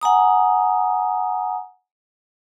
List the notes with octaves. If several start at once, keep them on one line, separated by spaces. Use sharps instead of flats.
F#5 G#5 A#5 D#6